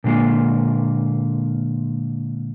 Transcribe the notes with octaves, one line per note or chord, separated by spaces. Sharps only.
A#2 D3 G#3 A#3